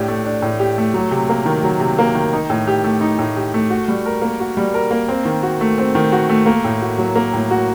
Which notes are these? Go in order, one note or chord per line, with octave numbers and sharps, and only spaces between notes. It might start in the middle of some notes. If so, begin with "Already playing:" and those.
Already playing: A2 D4 G4
A3
D4
A2
G4
A3
F#3
C3
A#3
D#3
F#3
C3
A#3
D#3
D#4
A2
G4
A3
D#4
A2
G4
A3
F#4
G3
A#4
A#3
F#4
G3
A#4
A#3
C4
D#3
F#4
A3
C4
D#3
F#4
A3
A#3
A2
F#4
F#3
A#3
A2
F#4